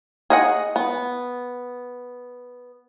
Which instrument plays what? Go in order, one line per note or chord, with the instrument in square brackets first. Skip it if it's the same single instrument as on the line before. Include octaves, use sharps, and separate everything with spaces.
[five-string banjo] G#4 D#5 F#5
B3